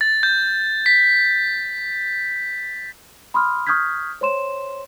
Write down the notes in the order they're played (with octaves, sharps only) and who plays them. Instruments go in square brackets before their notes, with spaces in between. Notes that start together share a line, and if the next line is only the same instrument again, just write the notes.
[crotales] A6
G6
B6
[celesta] B5 C6 D#6 F6
C#6 D#6 F6 G6 G#6 B6
C5 C#5 C6 E7